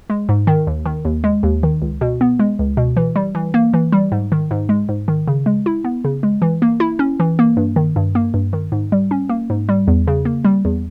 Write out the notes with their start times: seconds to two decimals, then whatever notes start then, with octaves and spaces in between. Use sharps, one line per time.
0.10 G#3
0.29 G#2
0.47 D#3
0.67 D#2
0.86 D#3
1.05 D#2
1.24 G#3
1.43 D#2
1.63 D#3
1.82 C#2
2.01 B2
2.21 B3
2.39 G#3
2.59 C#2
2.77 B2
2.97 E3
3.16 G3
3.35 E3
3.54 A#3
3.74 E3
3.92 G3
4.12 G#2
4.32 D#3
4.51 G#2
4.69 G#3
4.89 G#2
5.08 D#3
5.28 C#3
5.46 G#3
5.66 E4
5.84 B3
6.05 C#3
6.23 G#3
6.42 E3
6.62 A#3
6.80 E4
6.99 C#4
7.20 E3
7.39 A#3
7.57 G2
7.76 D#3
7.96 G2
8.15 A#3
8.34 G2
8.53 D#3
8.72 G#2
8.92 G3
9.11 C#4
9.29 A#3
9.50 G#2
9.69 G3
9.88 E2
10.07 C#3
10.25 A#3
10.45 G3
10.65 E2